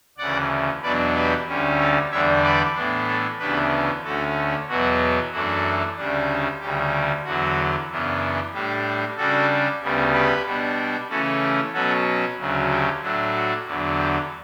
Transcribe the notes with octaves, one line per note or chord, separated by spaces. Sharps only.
D2 C#3 E3 D5 F#5
E2 B2 F#3 B3 D4 B4 D5
G4 B4
D2 D3 G3 C#4
A4 C#5
E2 D3 G3 D4 C#5 E5
B4 D5
A2 E3 B3 D4
A4 C#5
D2 C#3 E3 B3 D4 G4 B4
D2 D3 A3 C#4 F#4 A4
E2 B2 F#3 B3 F#4
F#2 E3 A3 D4 F#4
D2 C#3 G3 D4
D2 C#3 G3 G4
E2 D3 F#3 F#4
F#2 C#3 E3 B3 D4
A2 G3 D4 G4
C#3 G3 D4 F#4 A4
D2 C#3 G3 B3
G4 B4
B2 G3 B3 D4
C#3 E3 A3 C#4 F#4 A4
G4
B2 F#3 C#4 F#4 A4
D2 C#3 F#3
G4
A2 F#3 A3 D4
F#4
E2 D3 F#3
G4